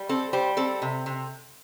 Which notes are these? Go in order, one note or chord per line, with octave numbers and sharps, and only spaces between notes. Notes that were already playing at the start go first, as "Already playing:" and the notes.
Already playing: G3
C4 A4
G3 C5
C4 A4
C3
C3